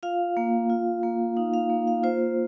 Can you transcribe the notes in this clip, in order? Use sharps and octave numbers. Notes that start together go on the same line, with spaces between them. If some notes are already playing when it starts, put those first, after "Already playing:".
F4 F5
A#3
F4
A#3
D#4 F5
F5
A#3
F5
F4 C5